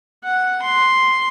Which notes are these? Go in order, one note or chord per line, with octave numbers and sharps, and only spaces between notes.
F#5
C6